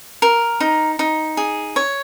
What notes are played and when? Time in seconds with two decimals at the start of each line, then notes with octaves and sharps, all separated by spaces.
0.22 A#4
0.60 D#4
0.99 D#4
1.37 G#4
1.76 C#5